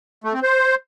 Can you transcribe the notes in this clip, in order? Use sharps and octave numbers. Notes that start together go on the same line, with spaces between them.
A3
C4
C5